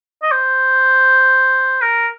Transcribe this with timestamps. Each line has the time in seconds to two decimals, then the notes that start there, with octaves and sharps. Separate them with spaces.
0.23 D#5
0.31 C5
1.81 A#4